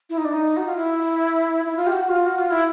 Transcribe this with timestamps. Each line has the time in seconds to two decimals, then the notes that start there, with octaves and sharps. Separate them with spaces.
0.10 E4
0.18 D#4
0.25 D4
0.33 D#4
0.57 F#4
0.66 F4
0.76 E4
1.65 E4
1.76 F4
1.87 G4
1.92 F#4
2.09 F4
2.26 F#4
2.38 F4
2.51 E4